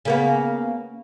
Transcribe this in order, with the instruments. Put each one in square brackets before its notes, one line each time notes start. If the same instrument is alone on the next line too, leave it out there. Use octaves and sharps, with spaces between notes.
[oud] C#3 A#3 B3